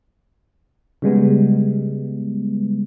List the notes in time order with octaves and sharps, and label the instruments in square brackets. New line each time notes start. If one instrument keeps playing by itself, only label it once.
[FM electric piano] C#3 G3 G#3 B3